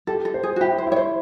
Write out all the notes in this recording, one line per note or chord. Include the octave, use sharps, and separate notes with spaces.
G4 A4
A4
C5
G#4
F#4
E4 G4
C5
E4 C#5
C5